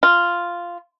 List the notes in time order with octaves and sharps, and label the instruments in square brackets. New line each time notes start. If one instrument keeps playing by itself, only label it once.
[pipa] F4